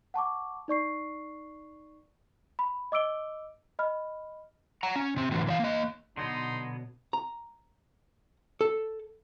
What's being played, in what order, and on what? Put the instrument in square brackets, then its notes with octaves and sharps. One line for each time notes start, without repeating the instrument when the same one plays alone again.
[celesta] F#5 A5 C#6 D6
D#4 D5 C#6 C7
B5
D#5 D6 E6 D7 G7
D#5 B5 F6
[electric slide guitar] F#5 A#5
C#4
C3 C4
A2 D3 E3 F#3
E3 D5 F5
A#3 D#5
[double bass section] B2 [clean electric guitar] D3 F#3 B3 [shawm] D#4 [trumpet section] C6
[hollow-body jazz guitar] A#5
A4